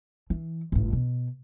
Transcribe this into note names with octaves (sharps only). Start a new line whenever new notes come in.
E3
G1 A2
B2